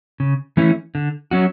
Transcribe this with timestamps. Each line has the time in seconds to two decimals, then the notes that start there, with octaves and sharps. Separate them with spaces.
0.20 C#3
0.57 E3 A3 C#4 E4
0.95 D3
1.31 F#3 C#4 F#4